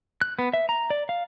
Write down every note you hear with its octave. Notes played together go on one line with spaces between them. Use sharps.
F#6
B3
E5
A#5
D5
F5